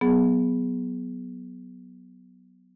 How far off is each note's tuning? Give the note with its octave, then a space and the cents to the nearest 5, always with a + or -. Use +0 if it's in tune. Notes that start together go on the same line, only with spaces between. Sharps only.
F#3 +0 B3 +0 G#4 +0